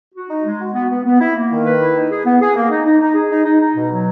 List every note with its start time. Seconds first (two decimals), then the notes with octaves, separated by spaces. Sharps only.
0.15 F#4
0.30 D#4
0.44 G#3
0.59 F#4
0.74 B3
0.89 B3
1.04 B3
1.20 E4
1.35 A#3
1.50 D#3
1.64 B4
1.80 E4
1.95 D#4
2.09 G#4
2.25 B3
2.40 G#4
2.56 A#3
2.71 D#4
2.85 D#4
3.00 D#4
3.15 G#4
3.30 D#4
3.45 D#4
3.61 D#4
3.75 B2
3.91 F#3